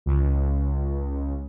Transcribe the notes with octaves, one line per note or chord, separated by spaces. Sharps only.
C#2